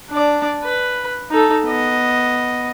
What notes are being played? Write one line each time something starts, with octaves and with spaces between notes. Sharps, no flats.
D4 D5
B4
D#4 A4
B3 D#5